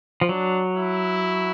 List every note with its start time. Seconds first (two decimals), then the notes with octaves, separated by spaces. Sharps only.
0.21 F3
0.29 F#3 D4
0.76 E4